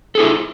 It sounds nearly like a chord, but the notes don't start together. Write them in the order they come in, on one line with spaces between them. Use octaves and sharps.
A4 G#4 E4